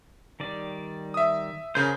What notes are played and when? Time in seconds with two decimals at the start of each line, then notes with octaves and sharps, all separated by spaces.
0.40 D#3 G3 D5
1.14 E5 D#6
1.75 C#3 C#4 G#4 A#4 C5 G6